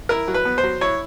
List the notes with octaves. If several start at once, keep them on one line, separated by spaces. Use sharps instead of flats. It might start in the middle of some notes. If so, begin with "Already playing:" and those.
E4 A#4
F#3
B4
B3
C5
F#3
E4 C#5